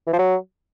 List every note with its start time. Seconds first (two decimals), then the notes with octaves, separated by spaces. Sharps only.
0.07 E3
0.13 F3
0.19 F#3